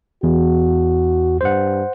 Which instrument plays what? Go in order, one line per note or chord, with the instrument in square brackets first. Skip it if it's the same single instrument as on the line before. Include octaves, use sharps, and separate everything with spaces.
[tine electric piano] E2 [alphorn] F#4
[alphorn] G2 [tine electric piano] C5 F#5